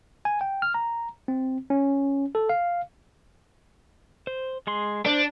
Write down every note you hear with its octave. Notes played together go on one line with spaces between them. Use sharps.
G#5
G5
F6
A#5
C4
C#4
A4
F5
C5
G#3 G#4 C6
D4 C5